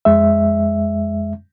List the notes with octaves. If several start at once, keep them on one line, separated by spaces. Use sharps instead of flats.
F2 G#3 E5